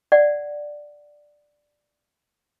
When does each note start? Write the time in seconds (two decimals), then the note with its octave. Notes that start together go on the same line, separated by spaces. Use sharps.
0.12 D5 F#5